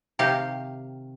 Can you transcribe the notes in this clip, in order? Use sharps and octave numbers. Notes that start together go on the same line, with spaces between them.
C3 D#3 G4 F5